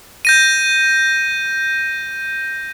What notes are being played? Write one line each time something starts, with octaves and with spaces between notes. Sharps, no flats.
G6 A#6 D#7